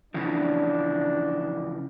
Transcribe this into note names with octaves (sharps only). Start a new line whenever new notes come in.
C#3 E3 F3 D4